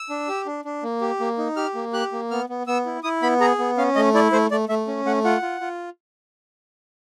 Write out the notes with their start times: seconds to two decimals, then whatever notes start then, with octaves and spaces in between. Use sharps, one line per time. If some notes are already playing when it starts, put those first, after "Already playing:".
Already playing: E6
0.10 D4
0.28 G4
0.46 D4
0.65 D4
0.83 A#3
1.01 G4
1.20 A#3
1.38 D#4
1.56 G4 F6
1.75 A#3
1.93 G4 F#6
2.12 A#3
2.31 B3 F6
2.49 B3
2.67 B3 E6
2.86 E4
3.03 E4 D#6
3.22 B3 B5
3.40 G#4 A#5
3.59 B3
3.78 C#4 F5
3.95 A3 D#5
4.14 E4 D5
4.32 A3 C5
4.51 A3 D5
4.69 A3 E5
4.87 C#4
5.05 A3 F#5
5.24 F4 F#5
5.42 F4
5.61 F4